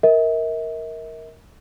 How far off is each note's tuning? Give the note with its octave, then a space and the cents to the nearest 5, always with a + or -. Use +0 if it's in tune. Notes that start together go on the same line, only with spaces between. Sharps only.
A#4 +0 E5 -45